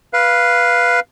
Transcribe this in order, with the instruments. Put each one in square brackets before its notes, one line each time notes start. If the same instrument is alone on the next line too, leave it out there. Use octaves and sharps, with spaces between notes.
[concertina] B4 F5